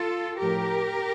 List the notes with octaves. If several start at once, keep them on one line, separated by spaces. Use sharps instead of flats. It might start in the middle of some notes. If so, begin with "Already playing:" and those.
Already playing: F4 A4
A2 F3 G4 A#4